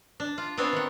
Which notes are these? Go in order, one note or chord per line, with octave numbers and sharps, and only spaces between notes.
D4
F4
B3 C4 D4 C5 C#5
D#3 F#5